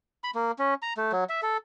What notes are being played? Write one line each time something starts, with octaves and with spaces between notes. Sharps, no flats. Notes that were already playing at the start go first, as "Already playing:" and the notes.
B5
A#3
C#4
A#5
A3
F#3
E5
A4